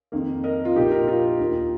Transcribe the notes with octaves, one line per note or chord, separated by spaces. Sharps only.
F2 D#3 A#3
A#4 D#5
F4
A#1 A#2 A#3 D#4 G4
F4 A#4
F4 A#4
D#2 D#3 A#3